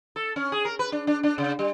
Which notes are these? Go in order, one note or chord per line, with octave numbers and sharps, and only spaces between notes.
A4
C#4
G#4
A#4
B4
D4
D4
D4
C#3
G3